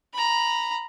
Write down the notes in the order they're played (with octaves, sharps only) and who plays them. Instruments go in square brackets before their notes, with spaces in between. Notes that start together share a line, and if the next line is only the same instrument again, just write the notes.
[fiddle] A#5 B5